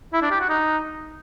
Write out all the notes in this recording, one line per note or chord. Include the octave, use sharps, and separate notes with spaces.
E4
D4
G4
F#4
D#4